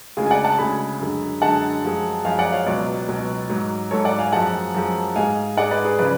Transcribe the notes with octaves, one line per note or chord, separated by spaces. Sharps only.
D2 C#3 G#3 F4 G#4
G#5
D5 F#5
F#5 A5
D2 C#3 G#3 G#5 B5
F#2 D3 G#3
F#2 D3 G#3 F#5 A5
F#2 F3 G#3
F#2 F3 G#3 F5 G#5
D5 F#5
C#5 F5
C#2 B2 F#3 B4 D5
C#2 B2 F#3
G#2 F#3
G#2 F#3 A4 C#5
D5 F#5
F5 G#5
F#2 F3 G#3 F#5 A5
F#2 F3 G#3
G#2 G#3 F5 G#5
G#2 G#3 D5 F#5
B4 D5
G#4 B4
C#3 F3 B4 D5